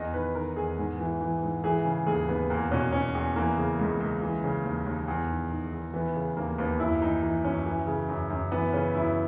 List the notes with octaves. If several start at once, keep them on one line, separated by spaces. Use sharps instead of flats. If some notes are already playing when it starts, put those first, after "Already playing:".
Already playing: E2 D#5
D#3 B4
D#3 A#4
E2 G#4
G#2
E3
E3
G#2
E3 G#4
C#3
D#2 G#4
D#2 B3
E2 A#3
B2 C#4
B2 C#4
E2
E3 A#3
C#3
C#2
C#2
E3
C#3
D#2
D#2
E2
D#3
D#3
E2
E3 B3
C#3
D#2 A#3
D#2 B3
F#2 E4
E3 D#4
E3 D#4
F#2 C#4
E3
C#3
F#2
F#2
E3 B3
C#3 C#4
F#2 E4